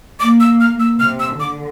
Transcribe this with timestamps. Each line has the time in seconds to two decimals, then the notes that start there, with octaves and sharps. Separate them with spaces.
0.20 A#3 D6
0.40 E6
0.60 F6
0.80 E6
1.00 C3 F6
1.20 E6
1.39 D3 D6